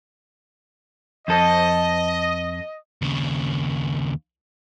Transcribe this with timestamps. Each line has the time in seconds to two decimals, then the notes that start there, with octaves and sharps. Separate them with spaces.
1.28 F2 A4 D#5
3.02 D#2 C#3